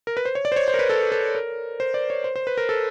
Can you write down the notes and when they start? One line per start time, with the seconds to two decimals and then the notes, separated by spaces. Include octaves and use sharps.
0.07 A#4
0.17 B4
0.25 C5
0.35 C#5
0.45 D5
0.52 C5
0.56 C#5
0.68 C5
0.74 A#4
0.79 B4
0.90 A4
1.12 A4
1.35 A#4
1.80 C5
1.94 D5
2.10 C#5
2.24 C5
2.36 C5
2.47 B4
2.57 A#4
2.69 A4